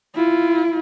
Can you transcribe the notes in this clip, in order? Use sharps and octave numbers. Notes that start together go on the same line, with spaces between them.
E4 F4